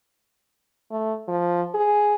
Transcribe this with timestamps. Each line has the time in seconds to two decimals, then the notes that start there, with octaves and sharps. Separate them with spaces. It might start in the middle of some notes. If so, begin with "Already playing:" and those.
0.91 A3
1.28 F3
1.74 G#4